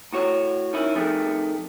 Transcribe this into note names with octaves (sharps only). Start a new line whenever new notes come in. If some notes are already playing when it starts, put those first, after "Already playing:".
A2 F#4 C#5
D#3 C#4 E4
F2 D#3 A3 G#4